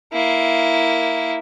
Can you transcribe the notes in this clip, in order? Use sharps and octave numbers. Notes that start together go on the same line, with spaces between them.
A#3 E4